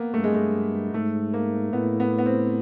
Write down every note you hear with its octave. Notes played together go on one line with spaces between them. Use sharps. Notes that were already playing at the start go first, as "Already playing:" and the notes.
Already playing: A#3 B3
G2 A3
G#3
A3
G#2 A3
A#3
A2 B3
B3
B3
C4